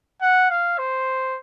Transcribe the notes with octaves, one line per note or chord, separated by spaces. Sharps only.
F#5
F5
C5